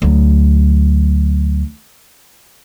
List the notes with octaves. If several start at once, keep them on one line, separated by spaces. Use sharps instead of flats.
D2 F#3